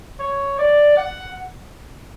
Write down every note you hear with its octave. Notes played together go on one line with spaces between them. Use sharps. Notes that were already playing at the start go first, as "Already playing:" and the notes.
C#5
D5
F#5